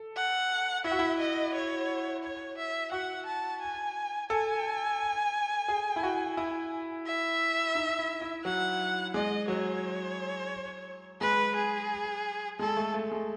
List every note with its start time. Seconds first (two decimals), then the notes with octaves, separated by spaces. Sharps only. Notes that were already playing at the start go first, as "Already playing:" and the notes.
Already playing: A4
0.16 F#5
0.84 E4 E5
0.92 F#4
0.99 E4
1.19 D#5
1.54 C#5
2.23 C#5
2.58 E5
2.91 F#4 F#5
3.26 A5
3.62 G#5
4.30 A4 G#5
5.68 G#4
5.96 E4
6.03 F#4
6.37 E4
7.06 E5
7.75 D#4
7.99 E4
8.21 E4
8.44 F#3 F#5
9.14 G#3 D#5
9.48 F#3 C#5
11.21 G#3 B4
11.55 G#4
12.59 G#3 A4
12.77 A3
12.94 A3
13.11 G#3